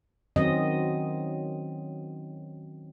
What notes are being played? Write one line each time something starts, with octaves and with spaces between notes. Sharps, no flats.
D#3 F#3 C4 C#4 D#5